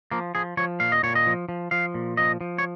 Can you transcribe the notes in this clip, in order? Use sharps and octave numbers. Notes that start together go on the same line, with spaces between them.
F3 A#3
F3 G#4
F3 C#5
A#2 F5
D#5
A#2 C#5
D#5
F3
F3
F3 F5
A#2
F3 D#5
F3
C#5